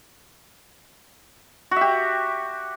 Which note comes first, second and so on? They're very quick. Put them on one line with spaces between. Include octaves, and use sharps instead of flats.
F#4 E5 G4